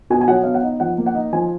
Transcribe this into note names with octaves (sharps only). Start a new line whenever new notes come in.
B2 G#5
G#5
F#3 F#5
B3 F5
F#5
D#4
F3 F#5
A#3
F#5
D#4
F3 G#5